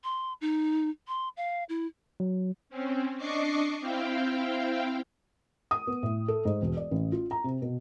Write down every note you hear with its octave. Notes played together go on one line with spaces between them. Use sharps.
C6
D#4
C6
F5
E4
F#3
C4 C#4
D4 D#5 C#6 D6 C7
C4 E4 F5 G5
D#6
B3
A2
A4
G#2
E1
D5
A1
F4
A#5
C3
B2